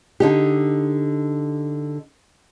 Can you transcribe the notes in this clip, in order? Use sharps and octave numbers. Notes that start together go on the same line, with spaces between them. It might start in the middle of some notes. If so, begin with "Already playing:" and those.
D3 D#4 G4